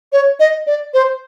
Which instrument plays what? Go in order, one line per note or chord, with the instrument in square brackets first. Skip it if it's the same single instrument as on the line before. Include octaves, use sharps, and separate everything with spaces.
[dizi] C#5
D#5
D5
C5